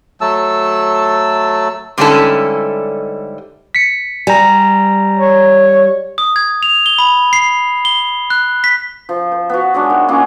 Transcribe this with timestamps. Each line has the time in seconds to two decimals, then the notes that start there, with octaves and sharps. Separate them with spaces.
0.21 F#3 A3 A5 E6
1.98 G#2 D3 G3 C#4 E4 A4
3.75 B6 C#7
4.27 G3 G#5 A#5
5.17 C#5
6.18 D#6
6.36 G#6
6.63 F7
6.86 G7
6.98 B5
7.33 C7
7.85 G7
8.30 F#6
8.64 B6
9.09 F3
9.32 C5
9.50 B3 F#4
9.74 F#3 G#3 D4
9.90 D#3
10.08 A#3 C#4 F4 G#4